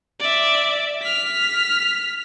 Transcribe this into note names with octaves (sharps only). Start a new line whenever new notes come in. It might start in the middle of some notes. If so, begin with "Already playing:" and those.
D5 E5
F6 B6